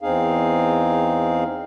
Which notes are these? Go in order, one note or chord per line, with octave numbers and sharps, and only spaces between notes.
E2 C4 D#4 G#4 F5